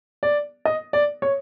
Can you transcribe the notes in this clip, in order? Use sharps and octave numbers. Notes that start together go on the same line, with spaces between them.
D5
D#5
D5
C#5